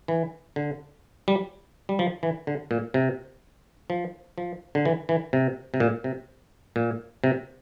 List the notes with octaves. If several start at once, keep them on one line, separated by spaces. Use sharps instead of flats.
E3
D3
G3
G3
F3
E3
D3
A#2
C3
F3
F3
D3
E3
E3
C3
C3
A#2
C3
A#2
C3